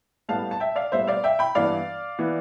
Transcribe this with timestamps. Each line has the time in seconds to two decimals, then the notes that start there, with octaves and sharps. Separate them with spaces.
0.29 A2 G3 B3 F5 A5
0.51 A5
0.60 E5 G5
0.76 D5 F5
0.92 A2 G3 B3 C5 E5
1.07 D5 F5
1.24 E5 G5
1.39 G5 B5
1.55 G2 E3 B3 D5 F5
2.19 E3 B3